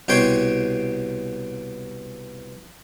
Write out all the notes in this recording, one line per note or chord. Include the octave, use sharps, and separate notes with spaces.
C2 B2 G4 C#5 G5 C6